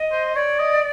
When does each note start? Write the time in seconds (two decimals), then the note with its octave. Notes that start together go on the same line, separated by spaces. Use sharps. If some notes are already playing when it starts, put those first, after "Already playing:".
Already playing: D#5
0.12 C5
0.35 C#5 D5
0.59 D#5